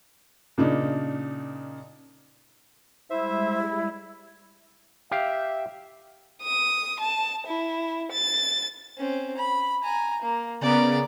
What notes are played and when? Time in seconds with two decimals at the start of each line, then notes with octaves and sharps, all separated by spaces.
0.58 A#2 C#3 D4 D#4
3.10 G3 G#3 E4 C5 E5
5.11 G4 E5 F5
6.42 D#6
7.00 A5
7.46 E4
8.12 A6
8.97 C4 C#4
9.37 B5
9.83 G#5 A#5
10.22 A#3
10.61 C#3 B3 A#4 D5